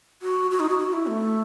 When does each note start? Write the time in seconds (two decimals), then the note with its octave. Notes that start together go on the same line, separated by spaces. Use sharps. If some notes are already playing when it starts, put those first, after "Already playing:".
0.22 F#4
0.51 F#4
0.60 D#4
0.69 F#4
0.79 F#4
0.93 E4
1.07 A3